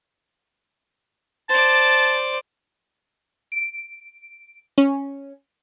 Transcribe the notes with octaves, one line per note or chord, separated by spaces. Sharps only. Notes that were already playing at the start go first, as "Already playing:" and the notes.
C5 D5 A5
D7
C#4